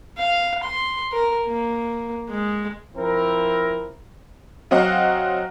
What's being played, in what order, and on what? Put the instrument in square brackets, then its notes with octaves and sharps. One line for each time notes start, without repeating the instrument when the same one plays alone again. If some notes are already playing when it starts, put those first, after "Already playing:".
[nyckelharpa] F5
C6
A#4
A#3
G#3
[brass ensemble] F3 C4 E4 A#4
[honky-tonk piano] F#3 C4 F#4 D#5 F5 F#5